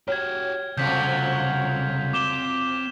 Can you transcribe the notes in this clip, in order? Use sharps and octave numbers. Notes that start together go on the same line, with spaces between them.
F#4 G4 C#5 F6 G#6
C2 F2 C#3 F3 F#3 G6 B6 F7
C4 D6 E7 G7